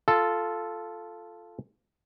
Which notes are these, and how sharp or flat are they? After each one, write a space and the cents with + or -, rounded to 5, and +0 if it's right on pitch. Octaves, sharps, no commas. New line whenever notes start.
F4 -5 A4 -5